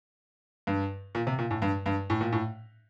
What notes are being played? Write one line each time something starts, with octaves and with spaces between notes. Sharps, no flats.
G2
A#2
C3
A#2
A2
G2
G2
A2
A#2
A2